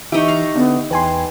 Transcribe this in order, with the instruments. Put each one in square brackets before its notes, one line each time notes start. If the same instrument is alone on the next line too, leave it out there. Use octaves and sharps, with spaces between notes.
[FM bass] E3 [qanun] D#4 G4 [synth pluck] E5 C#6
[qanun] F5 A#5
[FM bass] D3 [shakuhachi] B3
[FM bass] E2 [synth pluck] B4 G#5 C6 [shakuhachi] G5